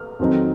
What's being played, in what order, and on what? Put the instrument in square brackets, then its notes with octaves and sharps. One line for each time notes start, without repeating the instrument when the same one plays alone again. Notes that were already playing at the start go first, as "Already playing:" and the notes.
Already playing: [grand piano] F6
F2 D#3 F#3 C4 D#4